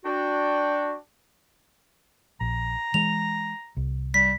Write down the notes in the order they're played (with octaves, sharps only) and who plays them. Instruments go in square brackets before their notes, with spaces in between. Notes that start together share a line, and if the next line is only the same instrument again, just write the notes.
[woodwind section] D4 F#4 G5
[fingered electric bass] A#1 [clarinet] A#5
[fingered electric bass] E3 G#3 [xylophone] F7
[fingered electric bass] C2
[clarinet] G3 [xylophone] B6